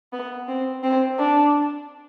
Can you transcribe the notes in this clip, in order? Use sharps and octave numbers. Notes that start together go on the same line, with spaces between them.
B3
C4
C4
D4